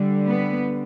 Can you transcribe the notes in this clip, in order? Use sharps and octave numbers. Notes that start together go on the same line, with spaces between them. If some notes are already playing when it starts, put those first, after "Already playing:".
Already playing: D3 G3
B3